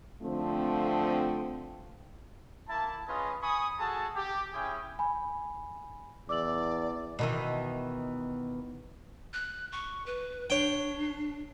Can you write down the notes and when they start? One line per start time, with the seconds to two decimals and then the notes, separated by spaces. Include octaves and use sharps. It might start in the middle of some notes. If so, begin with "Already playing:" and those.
0.23 D3 F3 A3 C4
2.69 A#3 E4 A5
3.07 C#4 F4 G#4 B4 D#5
3.42 G#5 B5 C#6 D#6
3.79 F#4 G#4 A4 A5
4.16 G4
4.53 C#4 E4 G#4 G5
4.99 G#5 B5
6.29 E2 D5 D6 E6 F#7
7.19 B2 D#3 E3
9.33 F#6
9.72 C#6
10.06 B4
10.50 D4 C#5 G5